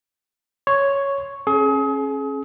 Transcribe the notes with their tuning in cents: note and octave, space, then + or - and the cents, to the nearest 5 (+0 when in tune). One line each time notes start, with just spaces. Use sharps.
C#5 +0 C6 +0
C#4 -30 G#4 +35